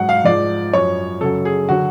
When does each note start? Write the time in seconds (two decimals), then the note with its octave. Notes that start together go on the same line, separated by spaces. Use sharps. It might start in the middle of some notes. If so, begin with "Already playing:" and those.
Already playing: G#2 F#3 F#5
0.09 F5
0.25 G#2 F3 D5
0.73 F#2 F3 C#5
1.21 F#2 C#3 F#3 A4
1.45 G#4
1.69 D3 F#3 F#4